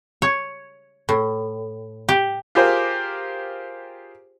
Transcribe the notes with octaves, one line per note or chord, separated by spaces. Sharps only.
C#5
A2
G4
F4 G4 G#4 A#4 C5